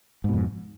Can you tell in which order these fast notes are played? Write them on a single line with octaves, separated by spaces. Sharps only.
G#2 B2 F2